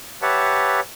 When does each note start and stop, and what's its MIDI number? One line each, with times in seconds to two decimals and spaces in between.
0.22 0.80 67
0.22 0.80 71
0.22 0.80 73
0.22 0.80 76
0.22 0.80 78
0.22 0.80 81